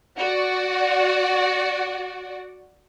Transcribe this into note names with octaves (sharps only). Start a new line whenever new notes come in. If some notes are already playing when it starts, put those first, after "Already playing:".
F#4 D5